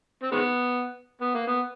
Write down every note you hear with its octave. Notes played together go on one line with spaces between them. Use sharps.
C4
D#3 G#3 B3
B3
A#3
B3